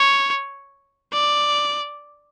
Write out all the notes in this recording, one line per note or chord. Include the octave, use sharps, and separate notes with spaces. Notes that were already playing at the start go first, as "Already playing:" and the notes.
Already playing: C#5
D5